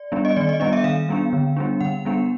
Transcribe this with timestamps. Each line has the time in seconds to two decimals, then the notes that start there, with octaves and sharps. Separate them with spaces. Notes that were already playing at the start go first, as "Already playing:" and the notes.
Already playing: D5
0.12 G3 B3 D4
0.25 D#5
0.36 D#3 D5
0.49 D#5
0.60 G3 B3 D4 D#5
0.73 E5
0.84 D#3 F5
1.09 G3 B3 D4
1.33 D3
1.57 G3 B3 D4
1.81 D3 F#5
2.05 G3 B3 D4